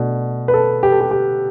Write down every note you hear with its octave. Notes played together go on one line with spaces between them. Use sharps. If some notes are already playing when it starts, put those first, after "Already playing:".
Already playing: B2 A3 D4
B4
A4
G4
A4
G4
G4